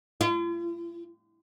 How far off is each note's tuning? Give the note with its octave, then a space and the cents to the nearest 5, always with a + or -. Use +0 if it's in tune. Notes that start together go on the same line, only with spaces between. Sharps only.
F4 -45